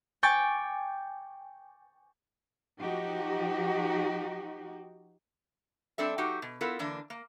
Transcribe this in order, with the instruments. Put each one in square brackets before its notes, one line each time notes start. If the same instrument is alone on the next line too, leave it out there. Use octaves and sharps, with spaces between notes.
[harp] G5 G#5 C#6 D6 A6
[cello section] F3 D#4 F#4 G4
[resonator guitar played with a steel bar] G3 C4 D4 A4 E5
F#3 D#4 F#4 G4
B2
B3 E4 F4 A4 A#4
D3 E3 A#3 D4
A#3